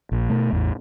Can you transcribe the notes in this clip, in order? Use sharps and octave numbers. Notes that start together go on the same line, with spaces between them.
A#1
B2 A3
A1 E2